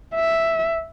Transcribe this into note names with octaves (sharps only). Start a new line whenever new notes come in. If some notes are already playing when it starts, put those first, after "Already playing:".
E5